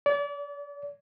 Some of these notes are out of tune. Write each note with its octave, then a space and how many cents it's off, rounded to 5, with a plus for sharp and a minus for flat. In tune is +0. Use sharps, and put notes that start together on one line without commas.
D5 -35